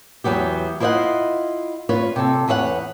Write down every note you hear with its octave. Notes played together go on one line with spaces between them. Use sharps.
E2 G#2 F#3 B3 G4
E4 F4 C5 D5 D#5 F#5
F4 B4 C#5
C3 A4
E2 B4 C#5 F5 F#5